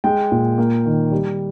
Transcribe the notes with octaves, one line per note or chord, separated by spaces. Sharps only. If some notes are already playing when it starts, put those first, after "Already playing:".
G#3 G5
A#2
A#3
D#3
G3